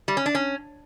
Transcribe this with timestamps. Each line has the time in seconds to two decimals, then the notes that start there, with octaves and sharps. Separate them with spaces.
0.08 G3
0.17 C#4
0.26 D4
0.35 C#4